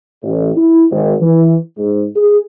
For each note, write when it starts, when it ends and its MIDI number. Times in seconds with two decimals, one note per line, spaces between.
0.23 0.50 33
0.56 0.84 64
0.91 1.14 32
1.21 1.55 52
1.77 2.05 44
2.16 2.39 68